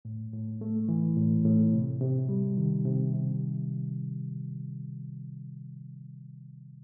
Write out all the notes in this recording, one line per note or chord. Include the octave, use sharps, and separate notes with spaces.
A2
A2
A3
E3
A2
A2
C3
C3
G3
D#3
C3
C3